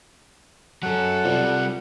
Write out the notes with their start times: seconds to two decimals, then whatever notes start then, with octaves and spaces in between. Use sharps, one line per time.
0.83 F#3 C#4 A4 F#5
1.25 C3 G3 F4 C5 D5